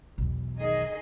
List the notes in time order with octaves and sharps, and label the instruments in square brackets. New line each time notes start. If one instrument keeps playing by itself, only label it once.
[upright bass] B1 E2
[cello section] D#3 G#4 D#5